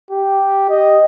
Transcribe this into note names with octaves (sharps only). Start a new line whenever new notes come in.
G4
D#5